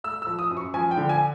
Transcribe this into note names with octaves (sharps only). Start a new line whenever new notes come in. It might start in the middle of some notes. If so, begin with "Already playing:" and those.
A3 E6
E6
F3
D#6
F#2
C#6
F3 G#5
G5
D3
G#5